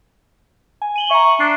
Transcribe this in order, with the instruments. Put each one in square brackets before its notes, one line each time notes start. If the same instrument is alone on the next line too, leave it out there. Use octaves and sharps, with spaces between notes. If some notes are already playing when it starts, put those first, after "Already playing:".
[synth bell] G#5
D#7 F#7 G7
[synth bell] E5 A#5 [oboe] C#6
[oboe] D4 [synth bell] C7